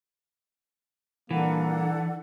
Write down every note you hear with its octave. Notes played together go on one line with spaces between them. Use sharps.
A#2 E3 G3 A#3 D4 A4 F#5